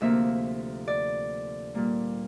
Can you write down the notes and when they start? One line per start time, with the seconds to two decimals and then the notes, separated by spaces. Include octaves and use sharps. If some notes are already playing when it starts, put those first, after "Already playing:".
0.01 D2 C3 F3 A#3 E5
0.88 D5
1.75 A#2 G3 A#3